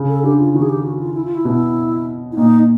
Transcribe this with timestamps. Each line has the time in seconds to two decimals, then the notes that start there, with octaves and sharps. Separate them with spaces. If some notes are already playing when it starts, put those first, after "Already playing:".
Already playing: C#3
0.08 A4
0.23 D3 G4
0.39 F4
0.54 D#3 F#4
0.62 G#4
0.69 G4
0.84 F#4
1.00 F4
1.14 E4
1.25 F4
1.35 E4
1.45 B2
2.32 E4
2.37 A#2 D#4